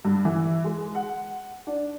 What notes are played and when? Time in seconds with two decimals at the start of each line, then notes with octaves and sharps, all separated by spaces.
0.05 G2
0.25 E3
0.64 G#3
0.95 F#5
1.67 D4